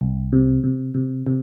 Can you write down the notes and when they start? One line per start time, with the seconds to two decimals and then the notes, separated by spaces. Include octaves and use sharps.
0.01 C2
0.33 C3
0.64 C3
0.94 C3
1.27 C3